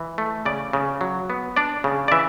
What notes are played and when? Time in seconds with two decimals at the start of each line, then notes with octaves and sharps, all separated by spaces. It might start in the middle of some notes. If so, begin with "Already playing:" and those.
Already playing: E3
0.18 A3
0.46 C#3 D5
0.73 C#3
1.01 F#3
1.30 B3
1.57 D4 D5
1.84 C#3
2.08 D5
2.12 E3 E5